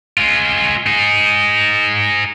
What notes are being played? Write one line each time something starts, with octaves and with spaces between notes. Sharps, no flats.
G#3 F4
D#4 G#4